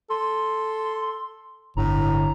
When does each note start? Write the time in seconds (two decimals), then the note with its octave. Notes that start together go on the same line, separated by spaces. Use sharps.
0.10 A4 C6
1.77 G1 A2 D3 A#5